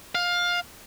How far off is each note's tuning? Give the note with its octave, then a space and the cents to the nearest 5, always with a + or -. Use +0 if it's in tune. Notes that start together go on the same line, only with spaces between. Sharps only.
F5 +15